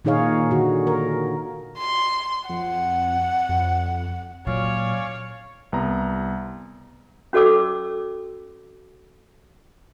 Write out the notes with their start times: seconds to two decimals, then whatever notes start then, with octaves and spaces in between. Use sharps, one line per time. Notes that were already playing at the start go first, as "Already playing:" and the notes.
0.05 A#2 D#3 D#4 G#4 C#5 F5
0.51 D3 F#4
0.87 A#4
1.79 C6
2.49 F2 F#5
3.49 F2
4.47 A#2 F#3 C#4 C#5 D5 F5
5.72 C2 B3 A#5
7.33 C#4 F#4 A4 D5 D6 E6